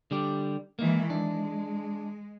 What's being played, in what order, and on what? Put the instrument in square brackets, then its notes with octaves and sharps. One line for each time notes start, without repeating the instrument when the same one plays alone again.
[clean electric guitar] D3 G3 G4
[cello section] D#3 E3 G#3 [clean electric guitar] A#3
[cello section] G#3 [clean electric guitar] D4